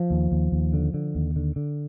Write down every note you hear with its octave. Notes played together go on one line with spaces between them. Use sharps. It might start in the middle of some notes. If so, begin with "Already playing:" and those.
Already playing: F3
D#2
D#2
D#2
D3
D3
D#2
D3
D3